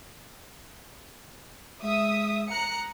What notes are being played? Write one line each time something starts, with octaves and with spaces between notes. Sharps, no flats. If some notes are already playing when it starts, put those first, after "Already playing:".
G#3 E5 D#6
A#5 F#6 C#7